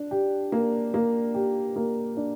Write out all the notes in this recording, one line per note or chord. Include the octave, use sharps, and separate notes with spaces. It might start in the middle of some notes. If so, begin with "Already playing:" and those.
Already playing: D4
G4
A#3
A#3
G4
A#3
D4